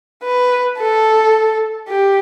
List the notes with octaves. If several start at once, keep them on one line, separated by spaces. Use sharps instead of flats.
B4
A4
G4